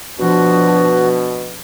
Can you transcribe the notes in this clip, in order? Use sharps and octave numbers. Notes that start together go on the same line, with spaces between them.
B2 F3 D4 F#4